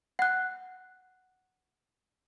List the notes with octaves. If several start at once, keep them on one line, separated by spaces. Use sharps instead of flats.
F#5 F#6